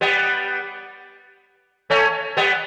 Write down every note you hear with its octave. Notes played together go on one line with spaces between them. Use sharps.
G3 B3
A3 C#4
G3 B3